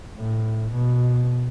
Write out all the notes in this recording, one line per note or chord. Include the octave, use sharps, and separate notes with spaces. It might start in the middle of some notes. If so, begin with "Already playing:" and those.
A2
B2